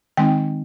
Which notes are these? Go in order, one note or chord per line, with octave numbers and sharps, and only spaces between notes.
D#3 G#3 C4 D#4 G5